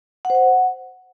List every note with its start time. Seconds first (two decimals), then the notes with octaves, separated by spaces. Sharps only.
0.25 F#5
0.30 C5
0.35 F#5